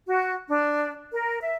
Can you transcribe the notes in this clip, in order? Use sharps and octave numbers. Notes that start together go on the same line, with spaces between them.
F#4
D4
A#4
E5